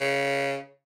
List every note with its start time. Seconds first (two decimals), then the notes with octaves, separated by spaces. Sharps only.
0.01 C#3